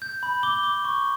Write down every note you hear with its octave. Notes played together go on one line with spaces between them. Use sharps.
G6
B5
D6 G7
D6
C#6